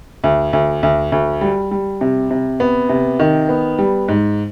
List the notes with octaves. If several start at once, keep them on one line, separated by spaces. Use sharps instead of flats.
D2
D2
D2
D2
G3
G3
C3
C3
B3
C3
D#3
B3
G3
G#2